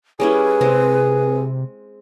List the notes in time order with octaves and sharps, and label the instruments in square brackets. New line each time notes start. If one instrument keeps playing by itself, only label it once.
[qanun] G3 C#4 E4 [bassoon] G#4 [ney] B4
[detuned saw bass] C3 [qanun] G#3 C4